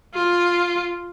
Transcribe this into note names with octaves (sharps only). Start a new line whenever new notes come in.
F4